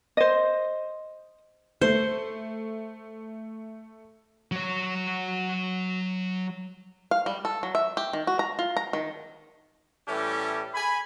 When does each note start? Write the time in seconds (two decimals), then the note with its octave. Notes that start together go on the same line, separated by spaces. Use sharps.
0.17 C5 D#5
1.81 A3 C5
4.52 F#3 C#5
7.11 F5
7.26 G3
7.45 A4
7.63 F#3
7.75 E5
7.97 G4
8.13 D#3
8.27 F#4
8.39 A#5
8.59 F4
8.77 A#5
8.93 D#3
10.08 A2 E3 G3 C#4 G4 A4
10.74 G#5 B5